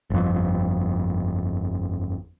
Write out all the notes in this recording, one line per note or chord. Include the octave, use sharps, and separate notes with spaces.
G1 F2